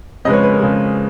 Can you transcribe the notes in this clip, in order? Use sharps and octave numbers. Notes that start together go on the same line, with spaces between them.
F2 C#3 G#3 B4 D#5
C#5
B4
A#4
F2 C#3 G#3